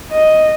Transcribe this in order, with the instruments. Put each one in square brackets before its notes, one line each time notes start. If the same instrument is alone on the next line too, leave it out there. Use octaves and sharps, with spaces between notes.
[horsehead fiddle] D#5